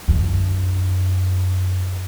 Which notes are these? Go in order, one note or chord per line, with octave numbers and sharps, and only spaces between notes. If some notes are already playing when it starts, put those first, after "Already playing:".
F#2 D4